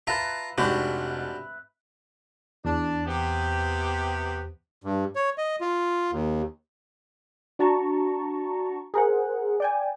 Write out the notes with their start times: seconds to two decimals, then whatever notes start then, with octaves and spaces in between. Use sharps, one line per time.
0.07 F4 B4 E5 A5 A#5
0.58 F1 G#2 D4 F#4 G4 B4
2.65 E2 D4
3.06 C3 B3 G4
4.84 G2
5.16 C#5
5.38 D#5
5.61 F4
6.11 D#2
7.59 D4 F#4 A5 A#5 C#6
8.94 G#4 A#4 C5 F#5
9.60 D5 G5 G#5